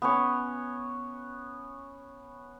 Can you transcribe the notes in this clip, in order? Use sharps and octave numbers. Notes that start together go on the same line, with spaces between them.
B3 C#4 C#5